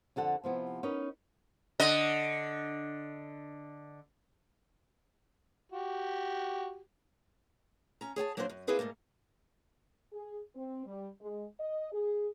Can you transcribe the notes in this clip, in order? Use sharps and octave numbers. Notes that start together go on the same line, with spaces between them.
F2 D3 A4 F#5
C3 F3 B3 E4
C#4 D#4 A#4 B4 D#5
D3 D#5
F#4 G4
C#4 A#5
G#4 C#5 G#5 A5
F#3 A#3 D4 F#4 G#4 C5
F#2
A#3 C4 E4 G#4 B4 C5
G#2 B2 A3 A#3
G#4
C4
G3
G#3
D#5
G#4